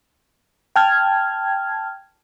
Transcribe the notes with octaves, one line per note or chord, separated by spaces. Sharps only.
G5 A5 F6 G#6